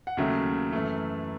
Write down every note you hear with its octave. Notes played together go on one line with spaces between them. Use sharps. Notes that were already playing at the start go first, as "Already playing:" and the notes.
F#5
D#2 C#3 F#3 A3 E5
F#2 E3 A3